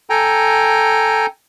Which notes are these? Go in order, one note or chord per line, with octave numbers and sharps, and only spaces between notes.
A4 G5 G#5 A#5